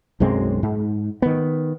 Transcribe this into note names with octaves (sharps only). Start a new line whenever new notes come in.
B1 F#2 G#3 C4
G#2
D#3 B3